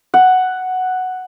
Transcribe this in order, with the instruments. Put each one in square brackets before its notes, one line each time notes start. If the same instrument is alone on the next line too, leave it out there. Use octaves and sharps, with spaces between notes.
[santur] F#5